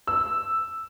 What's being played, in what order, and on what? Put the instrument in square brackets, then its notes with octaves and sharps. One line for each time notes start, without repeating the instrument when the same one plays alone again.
[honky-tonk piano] E6